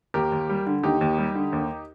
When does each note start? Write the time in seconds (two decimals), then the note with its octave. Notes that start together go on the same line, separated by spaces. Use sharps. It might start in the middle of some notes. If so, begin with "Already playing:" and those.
0.14 D#2 G4 A#4
0.32 D#2
0.49 G3
0.67 D3
0.83 D#2 D#4 G4
1.01 D#2
1.18 G3
1.35 D3
1.53 D#2